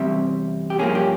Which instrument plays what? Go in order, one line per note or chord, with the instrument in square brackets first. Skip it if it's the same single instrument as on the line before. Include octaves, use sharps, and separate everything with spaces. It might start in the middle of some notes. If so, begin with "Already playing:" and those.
Already playing: [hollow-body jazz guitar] E2 C3 G3 C4 E5
G4
G2 F3 A#3 C#4 G#4
G4